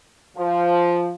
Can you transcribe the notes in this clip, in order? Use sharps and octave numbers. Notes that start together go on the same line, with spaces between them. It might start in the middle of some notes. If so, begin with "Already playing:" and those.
F3